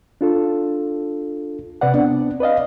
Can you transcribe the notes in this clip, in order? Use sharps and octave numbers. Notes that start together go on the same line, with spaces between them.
D4 F4 A4
C3 B4 D5 F#5
B3 C4 D4
B4 D5 D#5 F5